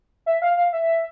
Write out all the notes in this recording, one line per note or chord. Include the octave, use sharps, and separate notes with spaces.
E5
F5
F5
E5